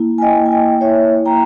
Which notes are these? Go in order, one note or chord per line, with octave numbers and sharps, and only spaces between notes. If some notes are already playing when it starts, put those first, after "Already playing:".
Already playing: A#3 E4
G#5
D#5 G5
A#3
G#5
D#5 G5
E4 C#5 E5
A#3 G5 A#5